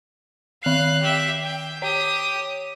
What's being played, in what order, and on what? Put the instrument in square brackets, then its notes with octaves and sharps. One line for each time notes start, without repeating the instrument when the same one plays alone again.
[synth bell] D#3 C7 [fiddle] F5 F#6
[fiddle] G4 E5
G5
[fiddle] G4 D#6 [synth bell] C#5